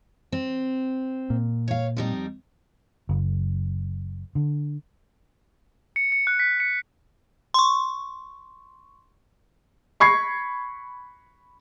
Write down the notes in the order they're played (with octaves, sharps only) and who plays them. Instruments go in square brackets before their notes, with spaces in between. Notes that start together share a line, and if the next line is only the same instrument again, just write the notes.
[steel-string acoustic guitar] C4
[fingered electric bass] A#2
[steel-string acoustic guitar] C#5 F5
F2 G3 D#4
[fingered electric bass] F#1
D3
[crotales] C#7
C#7
F#6
B6
C#7
[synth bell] C6 C#6
[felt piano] B5 C#6 G#6 C7